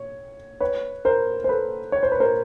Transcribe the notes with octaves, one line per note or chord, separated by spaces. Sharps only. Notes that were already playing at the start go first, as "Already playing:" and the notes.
Already playing: C#5
B4 C#5
A#4 C5
C5
A4 B4
C#5
C5
B4
A#4 C5